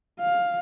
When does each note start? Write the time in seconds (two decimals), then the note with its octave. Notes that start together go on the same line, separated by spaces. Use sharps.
0.20 F5